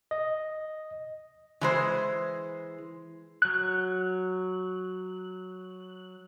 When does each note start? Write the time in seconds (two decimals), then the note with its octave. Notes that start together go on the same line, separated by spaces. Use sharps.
0.11 D#5
1.61 E3 G#3 C5
3.42 F#3 F#6